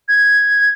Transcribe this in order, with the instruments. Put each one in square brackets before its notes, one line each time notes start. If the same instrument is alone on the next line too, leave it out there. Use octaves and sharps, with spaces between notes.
[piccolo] G#6